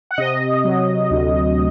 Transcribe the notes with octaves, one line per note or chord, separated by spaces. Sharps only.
F#5
C3 D#5
F#3
D2